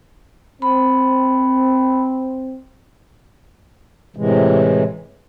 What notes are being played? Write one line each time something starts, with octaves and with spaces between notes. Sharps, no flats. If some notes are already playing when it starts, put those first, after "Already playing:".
C4 B5
A2 C3 E3 G#3